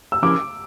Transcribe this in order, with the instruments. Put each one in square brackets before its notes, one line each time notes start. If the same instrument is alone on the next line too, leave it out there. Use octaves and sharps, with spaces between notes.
[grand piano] E6
[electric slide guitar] F3 C#4 E4 G4 A#4 [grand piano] D6